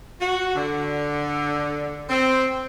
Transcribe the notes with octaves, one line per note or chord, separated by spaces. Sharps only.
F#4
D3
C4